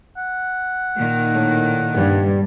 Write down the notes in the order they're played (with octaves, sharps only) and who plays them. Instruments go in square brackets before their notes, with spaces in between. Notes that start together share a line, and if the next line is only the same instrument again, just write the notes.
[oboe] F#5
[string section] A#2 D#3
[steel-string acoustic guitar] A2
[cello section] G2 [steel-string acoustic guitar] G3 B3